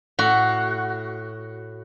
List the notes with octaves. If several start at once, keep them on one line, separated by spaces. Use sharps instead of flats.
A2 F#4